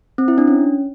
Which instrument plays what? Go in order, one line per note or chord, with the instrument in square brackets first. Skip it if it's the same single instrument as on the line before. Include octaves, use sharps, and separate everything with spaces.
[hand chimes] C4
E4
D4
C#4